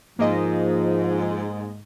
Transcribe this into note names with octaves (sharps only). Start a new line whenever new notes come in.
G#2 F3 A#3 D#5